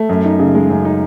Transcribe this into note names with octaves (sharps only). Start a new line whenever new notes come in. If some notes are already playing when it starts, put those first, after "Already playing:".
Already playing: A3
F#2
D#4
C#3
G#3
F#2
D#4